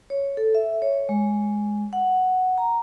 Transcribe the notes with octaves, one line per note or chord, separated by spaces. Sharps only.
C#5
A4
E5
C#5
G#3
F#5
A#5